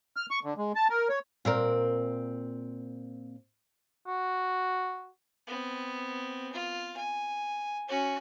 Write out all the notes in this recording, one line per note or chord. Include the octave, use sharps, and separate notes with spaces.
F6
C#6
D3
G#3
A5
A#4
C#5
A#2 C4 A#4
F#4
B3 C4
F4
G#5
C#4 F#4